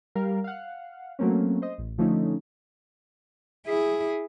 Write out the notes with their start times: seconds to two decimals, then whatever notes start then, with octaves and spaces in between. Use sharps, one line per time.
0.15 G3 A#4 F5
0.44 F5 F#5
1.19 F#3 A3 A#3 C4 C#4
1.62 C5 D#5
1.78 A1
1.98 D3 F3 A3 C#4 D#4
3.66 E4 G#4